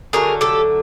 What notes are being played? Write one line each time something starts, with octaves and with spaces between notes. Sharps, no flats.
D3 F#3 A3 G#4 A#4
G4 A4